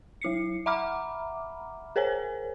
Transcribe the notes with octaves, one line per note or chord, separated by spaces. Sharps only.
F#3 E4 C7 C#7
E5 F#5 A#5 B5 D6 F6
G#4 A#4 C5 C#5 G#5